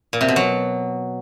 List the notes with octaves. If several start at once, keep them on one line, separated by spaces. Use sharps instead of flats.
A#2
C3
B2
F#3